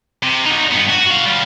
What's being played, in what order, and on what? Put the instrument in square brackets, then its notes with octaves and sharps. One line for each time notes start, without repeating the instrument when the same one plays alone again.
[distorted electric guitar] C3
D#4 F#4
G2 B3
F#4
F#4 F5
G3 F4